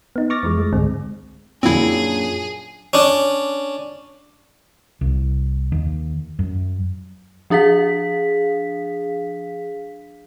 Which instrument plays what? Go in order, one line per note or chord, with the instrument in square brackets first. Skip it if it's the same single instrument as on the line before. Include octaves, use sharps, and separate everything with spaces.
[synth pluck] B3 D#4
C#6 D6 F6 A6 A#6
F2 E3 F3 G#3
G#3 A3
C#2 G#2 D3 G#3 C4
[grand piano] F#2 A#2 [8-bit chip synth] C4 E4 [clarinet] D4 [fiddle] G#4
[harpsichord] C#4 D4
[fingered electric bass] C2
D#2
F#2
[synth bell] F3 D4 G#4 F5 B6